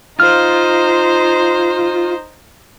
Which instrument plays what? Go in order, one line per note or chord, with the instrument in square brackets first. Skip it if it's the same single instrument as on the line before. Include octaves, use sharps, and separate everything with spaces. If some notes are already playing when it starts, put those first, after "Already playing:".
[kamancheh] D#4 C5 [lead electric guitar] F4 [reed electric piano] F6